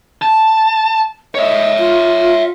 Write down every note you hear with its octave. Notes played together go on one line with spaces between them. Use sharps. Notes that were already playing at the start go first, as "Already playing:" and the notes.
A5
C#5 D#5 E5
F4